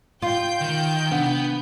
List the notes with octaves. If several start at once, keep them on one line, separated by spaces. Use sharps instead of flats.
F4 G5 G6
D#3 F5
C3 B3 D4 F#5